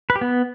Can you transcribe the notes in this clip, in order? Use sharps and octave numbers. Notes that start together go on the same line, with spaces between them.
B4
G4
B3